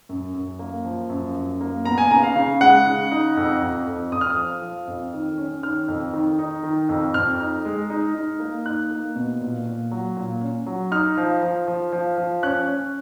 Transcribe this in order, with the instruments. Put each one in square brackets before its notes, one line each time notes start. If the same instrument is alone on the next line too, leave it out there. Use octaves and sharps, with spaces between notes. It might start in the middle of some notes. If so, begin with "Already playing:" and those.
[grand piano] F#2
F#2
A#3
F3
F#2
F#2
A#3
B3 A#5
G#5
C#3 A#5
F5
C#3
G#3 F#5
C#3
D#4
F2
F2
F2
F2 D#6
F6
D#6
F3
F3
F2
D#3
C#4
D#3 F6
F2
D#3
D#4
D#3
F2
F2 F6
D#4
G#3
D#4
D#4
A#3
D#4 F#6
A#3
B2
A#2
A#2
F#3
A#2
C#4
F#3
D#4 F6
F3
F3
F3
F3
F3
C#4 F#6
C#4